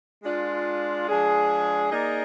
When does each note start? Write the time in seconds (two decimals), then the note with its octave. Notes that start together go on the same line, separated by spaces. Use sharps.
0.23 G#3 D4 F4
1.08 F3 G#3 D4 G#4
1.91 A#3 D#4 G#4 D5